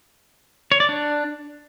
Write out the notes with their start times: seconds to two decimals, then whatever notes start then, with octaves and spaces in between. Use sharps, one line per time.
0.72 C#5
0.80 D5
0.89 D4